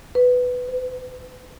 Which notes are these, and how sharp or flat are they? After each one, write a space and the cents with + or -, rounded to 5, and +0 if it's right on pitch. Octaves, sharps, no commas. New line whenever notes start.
B4 +10
B4 +45